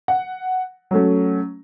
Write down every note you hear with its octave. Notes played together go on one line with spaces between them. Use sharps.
F#5
F#3 A3 C#4